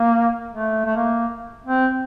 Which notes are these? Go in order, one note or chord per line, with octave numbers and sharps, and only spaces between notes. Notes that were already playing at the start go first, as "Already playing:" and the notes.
Already playing: A#3
A3
A3
A#3
C4